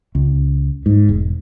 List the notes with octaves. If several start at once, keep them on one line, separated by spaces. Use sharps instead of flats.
C#2
G#2
E1